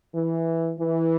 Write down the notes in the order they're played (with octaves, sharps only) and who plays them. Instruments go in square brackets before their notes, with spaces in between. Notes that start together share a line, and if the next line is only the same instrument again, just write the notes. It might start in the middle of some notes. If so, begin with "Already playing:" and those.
[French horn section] E3
E3